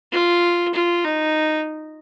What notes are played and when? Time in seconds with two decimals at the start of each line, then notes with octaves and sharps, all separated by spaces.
0.12 F4
0.74 F4
1.05 D#4